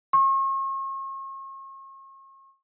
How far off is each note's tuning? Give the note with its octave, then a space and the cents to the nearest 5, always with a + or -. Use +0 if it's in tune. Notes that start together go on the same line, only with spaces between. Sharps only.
C#6 -40